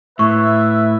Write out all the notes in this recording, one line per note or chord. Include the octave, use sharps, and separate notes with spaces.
A2 E4 B4 E5 C#6